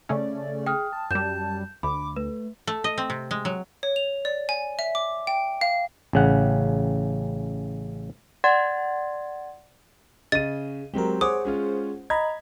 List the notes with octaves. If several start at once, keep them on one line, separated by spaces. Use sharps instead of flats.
C#3 A3 C#4 D5
G#4 G5 D#6 F6
A5
F#2 G3 G6 E7
D2 B5 D6
A3 B4
A3
D#5
C4
C3
G#3
F#3
C#5
F7
D5
G#5
E5
D6
G5
F5
A1 C#3 F#5
D5 F#5 C6 G#6 A6
C#3 D#5 A6 D#7
F#3 G#3 C4 G4 A#4
G#4 C5 C#5 F#5 D6 D#6
G#3 C#4 F4
D#5 A#5 B5 G#6